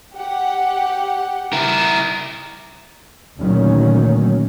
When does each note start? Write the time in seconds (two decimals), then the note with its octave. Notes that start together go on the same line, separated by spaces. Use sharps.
0.16 G4 F#5
1.53 E4 A#4
3.39 D2 A#2 D#3 F#3 C#4